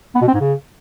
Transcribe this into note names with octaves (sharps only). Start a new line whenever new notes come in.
B3
B2
C4
G#2
C#3